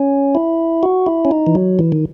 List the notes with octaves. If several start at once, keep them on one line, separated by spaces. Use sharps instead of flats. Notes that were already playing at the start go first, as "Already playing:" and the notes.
Already playing: C#4
E4
F#4
E4
C#4
D#4
E3
F#3
E3
D#3